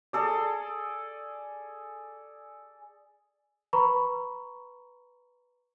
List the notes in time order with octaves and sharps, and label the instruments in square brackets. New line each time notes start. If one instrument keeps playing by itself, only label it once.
[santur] G#4 A4 D5
[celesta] B4 A#5 B5 C#6